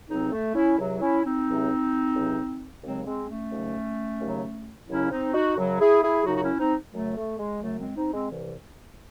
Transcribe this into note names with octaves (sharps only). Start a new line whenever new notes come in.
C#2 C3 F#3 C4 D#4
A3
C#4 E4
C#2 C3 F#3
C#4 E4
C4 D#4
C#2 C3 F#3
C#2 C3 F#3
D#2 C#3 F#3 G#3 C4
G#3 C4
A3 C#4
D#2 C#3 F#3
D#2 C#3 F#3
D#2 C#3 F#3 C#4 E4
C4 D#4
D#4 F#4
F#2 C#3 F#3
E4 G#4
E4 G#4
F#2 C#3 F#3 D#4 F#4
F#4
C#4 E4
C4 D#4
F#2 C#3 F#3 A3
A3
G#3
F#2 C#3 F#3 A3
G#3 C4
C4 D#4
G#3 C4
C2 C3 E3